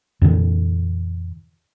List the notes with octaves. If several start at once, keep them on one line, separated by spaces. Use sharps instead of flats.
F2 A#2 D3 E3